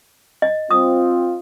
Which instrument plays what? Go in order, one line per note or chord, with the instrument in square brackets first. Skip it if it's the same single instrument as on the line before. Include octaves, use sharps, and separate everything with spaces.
[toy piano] D#5
[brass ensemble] C4 F4 [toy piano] D#6